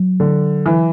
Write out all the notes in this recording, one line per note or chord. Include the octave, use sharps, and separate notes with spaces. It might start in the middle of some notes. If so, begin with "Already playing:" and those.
Already playing: F#3
D3
E3